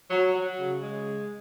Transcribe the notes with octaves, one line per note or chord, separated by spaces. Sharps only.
F#3
F#3
C#3
G#3